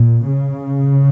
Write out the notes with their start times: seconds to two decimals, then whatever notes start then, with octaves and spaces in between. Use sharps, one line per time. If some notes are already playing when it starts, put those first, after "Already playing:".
Already playing: A#2
0.25 C#3